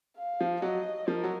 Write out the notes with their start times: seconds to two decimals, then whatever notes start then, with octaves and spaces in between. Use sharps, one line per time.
0.18 F5
0.41 F3
0.62 F#3 D#5
1.08 F3 A#4
1.24 F#3